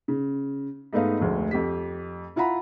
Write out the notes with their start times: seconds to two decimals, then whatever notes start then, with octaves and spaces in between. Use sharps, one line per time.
0.08 C#3
0.93 G#2 A3 B3 D#4 F5
1.21 F1 D2 G#3
1.51 F2 G4 B6
2.36 E4 F4 F#5 A#5 B5